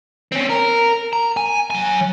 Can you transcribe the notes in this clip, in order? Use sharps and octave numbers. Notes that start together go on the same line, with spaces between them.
C4 C#4
A#4
A#5
G#5
F#3 G#5